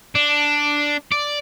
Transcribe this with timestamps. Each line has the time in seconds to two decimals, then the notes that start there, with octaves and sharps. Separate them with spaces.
0.15 D4
1.12 D5